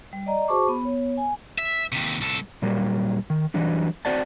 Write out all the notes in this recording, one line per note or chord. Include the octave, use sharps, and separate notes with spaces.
G3
D5 D#5 A#5
F#4 G#4 C5 A5 C#6 D6
B3 B5
B3 C#5
G#5
E5
D#2 C3
C2 A4
A#2 F#3 G3 A#3
D#3
E3 F#3 G3 D4
C4 F#4 C5 D5 F#5 A5